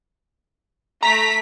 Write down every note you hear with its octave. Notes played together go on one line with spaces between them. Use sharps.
A3 A#5 B6